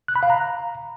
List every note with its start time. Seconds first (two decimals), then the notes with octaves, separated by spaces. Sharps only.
0.08 F#6
0.16 B5
0.23 F5
0.30 A#5